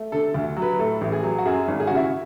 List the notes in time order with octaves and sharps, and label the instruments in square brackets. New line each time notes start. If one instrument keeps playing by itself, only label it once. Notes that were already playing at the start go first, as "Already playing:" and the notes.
Already playing: [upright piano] A3
D3 A4
D2
F#3
B4
A2 A4
A1
G#4
F#3
F#4
F#2 G#4
G#1
G#4
C#3 F#4
E4
F#4